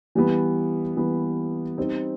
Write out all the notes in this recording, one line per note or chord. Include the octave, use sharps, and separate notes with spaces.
E3 G3 B3
E3 G3 B3
G3 C4 D#4